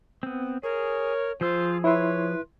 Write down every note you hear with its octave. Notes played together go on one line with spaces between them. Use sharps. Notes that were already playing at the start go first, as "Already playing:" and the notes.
B3 C4
G#4 A#4 C#5
F3 F4 G#4 C5 E6
E4 B4 C#5 C6